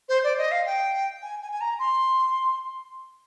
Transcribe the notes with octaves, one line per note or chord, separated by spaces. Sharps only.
C5
D5
D#5
F5
G5
G#5
G#5
G#5
A#5
C6